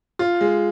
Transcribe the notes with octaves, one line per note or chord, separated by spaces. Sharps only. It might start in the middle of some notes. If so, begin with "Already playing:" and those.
F4
G#3